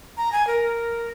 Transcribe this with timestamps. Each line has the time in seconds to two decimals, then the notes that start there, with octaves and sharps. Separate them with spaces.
0.17 A#5
0.32 G#5
0.47 A#4